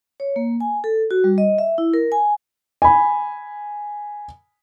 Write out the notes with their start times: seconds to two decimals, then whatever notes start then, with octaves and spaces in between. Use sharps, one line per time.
0.20 C#5
0.36 A#3
0.60 G#5
0.84 A4
1.11 F#4
1.24 G3
1.38 D#5
1.58 E5
1.78 E4
1.94 A#4
2.12 G#5
2.82 G#5 B5